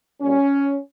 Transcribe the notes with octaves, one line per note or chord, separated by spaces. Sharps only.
A#2 G3 C#4